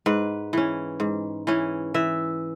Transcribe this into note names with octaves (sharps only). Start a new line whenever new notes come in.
G#2 B4
E3 C#4
G#2
E3 C#4
E3 E5